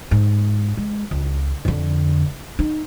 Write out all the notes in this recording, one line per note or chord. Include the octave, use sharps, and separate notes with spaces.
G#2
G#3
C#2
F2 D3
D#4